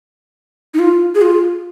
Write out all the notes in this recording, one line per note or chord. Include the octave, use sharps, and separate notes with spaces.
D#4
F4
G#4
F4